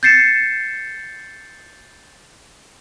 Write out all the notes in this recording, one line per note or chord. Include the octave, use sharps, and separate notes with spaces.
G6 A6 C7 C#7 E7